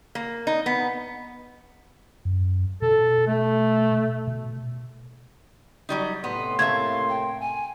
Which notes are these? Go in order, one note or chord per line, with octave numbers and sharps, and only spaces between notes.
A#3
D#4
B3
F#2
B2 A4
A3
B2
F#3 G3 D#4
A2 C3 B3 C6
A3 A#3 E5 F5 G#6
G5
G#5